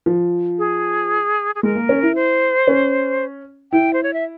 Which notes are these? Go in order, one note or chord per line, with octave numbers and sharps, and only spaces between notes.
F3
G#4
G#4
G#3 A#4
A#3
C#4
E4
C5
C#4
E4 G5
C5
C#5
E5